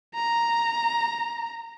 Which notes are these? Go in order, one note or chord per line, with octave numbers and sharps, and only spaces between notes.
A#5